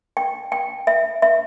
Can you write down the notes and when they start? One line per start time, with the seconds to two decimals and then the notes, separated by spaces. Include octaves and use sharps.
0.17 G5
0.52 G5
0.87 E5
1.22 E5